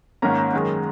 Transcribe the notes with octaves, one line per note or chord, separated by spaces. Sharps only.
G#2 D#3 A#3 C#4 A#5
A#5
F#2 D#3 G#3